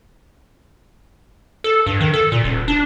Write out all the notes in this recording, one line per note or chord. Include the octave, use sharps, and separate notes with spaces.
A4
G2
D#3
A4
A#2
D#1
D4